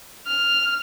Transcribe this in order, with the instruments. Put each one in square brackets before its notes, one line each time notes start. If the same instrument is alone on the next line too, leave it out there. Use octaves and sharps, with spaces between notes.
[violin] F6